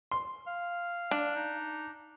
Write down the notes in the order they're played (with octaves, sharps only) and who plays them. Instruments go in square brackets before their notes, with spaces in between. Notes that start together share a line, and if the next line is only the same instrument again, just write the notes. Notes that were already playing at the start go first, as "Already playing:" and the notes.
[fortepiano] C6
[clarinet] F5
[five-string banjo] D4
[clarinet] D#4